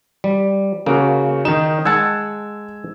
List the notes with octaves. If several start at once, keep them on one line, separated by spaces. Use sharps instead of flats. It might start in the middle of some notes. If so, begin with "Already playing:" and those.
G3
C#3 A#3 F#4
D#3 D#4 E7
G#3 F#5 A5 E6 G#6